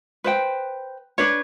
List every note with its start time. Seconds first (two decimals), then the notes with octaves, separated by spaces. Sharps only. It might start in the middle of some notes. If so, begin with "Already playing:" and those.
0.24 B4 C5 G5
1.18 D4 B4 C#5